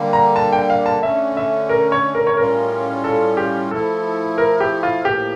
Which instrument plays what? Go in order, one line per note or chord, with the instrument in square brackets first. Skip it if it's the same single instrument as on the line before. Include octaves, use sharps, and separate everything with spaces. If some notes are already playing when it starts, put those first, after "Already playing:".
Already playing: [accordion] D3 G3 A#3
[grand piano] A#5
A5
G5
F5
A5
[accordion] D3 A3 C#4 [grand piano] E5
[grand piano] E5
A#4
C#5
A#4
C#5
[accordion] A2 G3 C#4 F4 [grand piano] A#4
[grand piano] A4
G4
[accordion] F3 A3 E4 [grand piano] A4
[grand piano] A#4
G4
F4
[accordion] A2 F3 A#3 [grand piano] G4